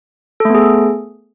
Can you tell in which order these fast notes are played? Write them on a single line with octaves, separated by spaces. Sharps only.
A4 A3 B3 G#4